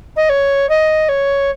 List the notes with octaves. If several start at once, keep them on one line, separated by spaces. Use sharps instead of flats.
D#5
C#5
D#5
C#5